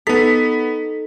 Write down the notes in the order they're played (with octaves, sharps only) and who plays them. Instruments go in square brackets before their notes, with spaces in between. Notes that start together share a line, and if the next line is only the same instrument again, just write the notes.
[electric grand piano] B3 B6 [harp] D#4 A4